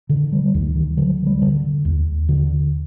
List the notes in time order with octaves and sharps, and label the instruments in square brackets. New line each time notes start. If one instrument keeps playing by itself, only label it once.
[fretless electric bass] D3 D#3
G3
D2 D#3
D#3
D3 F#3
G3
D3
D#2
D3